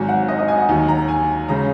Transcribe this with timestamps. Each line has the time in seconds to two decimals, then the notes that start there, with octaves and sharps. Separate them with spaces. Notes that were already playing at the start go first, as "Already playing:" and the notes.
Already playing: G#1 G#2 F#3 G#5
0.09 F#5
0.28 D#5
0.39 D#5
0.48 G#5
0.58 F#5
0.68 D#2 D#3 F#3 G#5
0.88 A#5
1.08 G#5
1.48 C#3 G#3 C#4 A#5